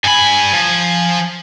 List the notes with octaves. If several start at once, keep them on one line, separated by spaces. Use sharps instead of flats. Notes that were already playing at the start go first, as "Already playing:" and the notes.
G2 G#5 B5
F3